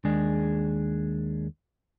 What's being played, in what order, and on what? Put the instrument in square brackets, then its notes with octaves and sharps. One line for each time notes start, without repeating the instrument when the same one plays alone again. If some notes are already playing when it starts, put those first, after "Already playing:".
[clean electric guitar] D#2 G#3 D4 G#4